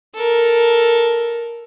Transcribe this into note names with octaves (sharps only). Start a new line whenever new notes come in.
A4 A#4